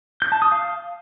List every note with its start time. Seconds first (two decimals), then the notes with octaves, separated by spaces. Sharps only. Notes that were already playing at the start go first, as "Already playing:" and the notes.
0.22 G6
0.32 A5
0.42 D#6
0.52 F5